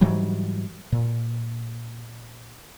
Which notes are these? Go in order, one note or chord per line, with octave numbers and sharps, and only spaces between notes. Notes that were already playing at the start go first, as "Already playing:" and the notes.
G#2 E3 F#3 G3
A#2